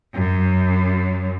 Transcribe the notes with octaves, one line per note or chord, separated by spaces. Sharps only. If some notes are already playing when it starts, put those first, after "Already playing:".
F#2